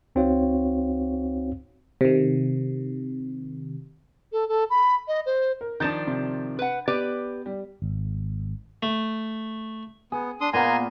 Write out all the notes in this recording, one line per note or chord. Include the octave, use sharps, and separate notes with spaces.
C#2 C4 D#4 F#4 C#5 F5
C3 D#3
A4
A4
B5
D#5
C5
A#4
D#3 F3 D4 G6 A6 E7
C3
B4 F#5
B3 G4 B4 D5
G3
G#1
A3
B3 G#4
D4 C6 D#6
A#2 A#3 B3 G#5 A#5 C6